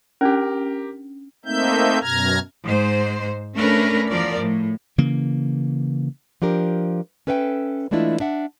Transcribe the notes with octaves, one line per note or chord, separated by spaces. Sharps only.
C#4 D4 G4 A#4
A3 A#3 C4 D#4 E5 G6
F#2 B2 A#5 F6 G#6
G#2 C5
A3 C#4 D4 A#4 B4
E2 F3 A#4 D5
A2
C#3 E3 A#3
F3 D4 G4 A#4
C#4 A4 B4 E5 F5 G5
E3 G#3 A3 D4 E4 F4
D4 E5 F#5